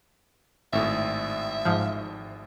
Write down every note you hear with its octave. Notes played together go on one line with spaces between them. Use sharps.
G#1 A2 E5
G#2 F3